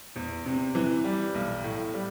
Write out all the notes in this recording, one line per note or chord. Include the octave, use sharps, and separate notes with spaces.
E2
C3
E3
G3
B1
A2
G3